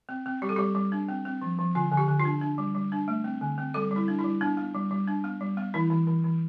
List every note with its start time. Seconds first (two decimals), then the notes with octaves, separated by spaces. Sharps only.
0.09 C4
0.26 C4
0.42 G3 G4
0.49 A4
0.56 G3 G4
0.75 G3
0.92 D4
1.09 C4
1.25 C4
1.42 F3
1.59 F3
1.75 D3 F4
1.92 D3
1.97 G4
2.08 D3
2.19 F4
2.25 D4
2.41 D4
2.58 G3
2.75 G3
2.92 D4
3.08 A3
3.24 C4
3.41 D3
3.58 C4
3.74 G3 A4
3.91 G3
3.96 E4
4.08 D4
4.19 E4
4.24 G3
4.41 B3 D4
4.57 B3
4.74 G3
4.91 G3
5.08 D4
5.24 B3
5.41 G3
5.57 B3
5.74 E3 E4
5.90 E3
6.07 E3
6.24 E3